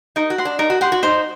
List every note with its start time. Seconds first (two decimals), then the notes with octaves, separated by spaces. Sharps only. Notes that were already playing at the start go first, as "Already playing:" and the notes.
0.16 D#4 A#4
0.30 F#4
0.38 F#5 C6
0.45 D4
0.59 D#4 A#4
0.70 F#4
0.81 G4 F#5 C6
0.92 F#4
1.03 D#4 C5